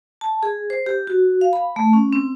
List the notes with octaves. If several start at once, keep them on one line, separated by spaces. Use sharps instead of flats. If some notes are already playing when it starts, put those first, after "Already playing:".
A5
G#4
C5
G4
F#4
F5
B5
A3
C#4
C4